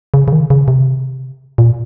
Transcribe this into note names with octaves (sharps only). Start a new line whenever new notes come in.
C#3
C#3
D#3
C#3
C3
A#2